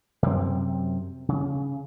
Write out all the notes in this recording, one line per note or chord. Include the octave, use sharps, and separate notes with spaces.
F#2 C3 C4
C#3